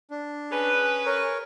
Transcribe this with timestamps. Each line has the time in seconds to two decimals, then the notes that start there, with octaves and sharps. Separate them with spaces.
0.11 D4
0.52 C#4 G#4 B4
1.06 A#4 C#5